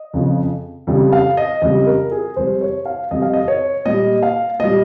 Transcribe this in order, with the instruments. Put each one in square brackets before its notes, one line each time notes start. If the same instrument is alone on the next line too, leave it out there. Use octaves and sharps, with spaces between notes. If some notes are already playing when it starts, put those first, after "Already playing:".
Already playing: [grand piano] D#5
F2 C#3 F3
F2 C#3 G3
F5
D#5
F2 C#3 G3 D#5
A#4
G#4
F2 C3 G3 C5
C#5
F5
F2 C3 G3 D#5
F5
D#5
C#5
A#2 G3 D#5
F5
A#2 G3 D#5